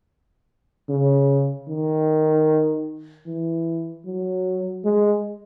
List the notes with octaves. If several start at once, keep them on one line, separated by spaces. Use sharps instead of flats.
C#3
D#3
E3
F#3
G#3